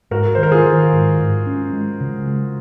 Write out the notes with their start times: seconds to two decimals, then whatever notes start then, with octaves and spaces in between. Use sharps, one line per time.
0.11 G#2 F#4 A#4
0.35 D#3 C5
0.43 A#4
0.52 F4 G#4
0.65 D#3
0.92 G#2
1.20 G#2
1.47 C#4
1.73 G#3
2.01 C#3
2.27 G#3